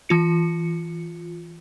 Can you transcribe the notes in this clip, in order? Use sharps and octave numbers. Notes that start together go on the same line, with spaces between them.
E3 F4 C#7